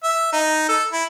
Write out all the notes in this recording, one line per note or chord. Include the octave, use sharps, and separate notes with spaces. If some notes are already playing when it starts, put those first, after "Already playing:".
E5
D#4
A4
E4